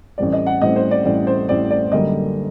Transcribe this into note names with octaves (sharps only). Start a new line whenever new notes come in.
A1 A2 G3 C4 D5
D#5
F#5
A1 A2 G3 C4 D#5
C5
D5
A1 A2 G3 C4 D5
C5
A1 A2 G3 C4 D5
D5
F#2 D3 G3 A#3 D#5